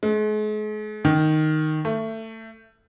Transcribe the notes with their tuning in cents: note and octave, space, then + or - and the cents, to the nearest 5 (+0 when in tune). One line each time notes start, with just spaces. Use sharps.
G#3 +40
D#3 -5
A3 +20